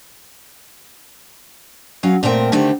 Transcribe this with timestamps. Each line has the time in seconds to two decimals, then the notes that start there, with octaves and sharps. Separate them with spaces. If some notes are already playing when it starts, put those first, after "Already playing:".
2.03 F#3 C#4 F5
2.23 A#2 A3 C4 A#4 G5
2.52 D3 D#3 A3 C4 G4